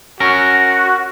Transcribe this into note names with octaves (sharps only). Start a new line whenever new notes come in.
C#4 F#4 A#4